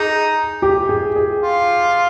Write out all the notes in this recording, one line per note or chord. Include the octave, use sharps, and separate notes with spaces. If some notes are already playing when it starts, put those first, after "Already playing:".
Already playing: D#4 G#4
G4
G#4
G#4
F4